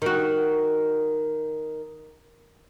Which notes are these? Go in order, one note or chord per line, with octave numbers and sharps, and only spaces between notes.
D#3 F#4